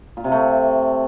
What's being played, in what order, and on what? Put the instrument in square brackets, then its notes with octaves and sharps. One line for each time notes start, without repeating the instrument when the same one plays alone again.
[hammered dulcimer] A#2
C3
A3